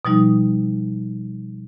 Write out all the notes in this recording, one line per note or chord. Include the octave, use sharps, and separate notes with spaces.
B2 F3 G3 D#4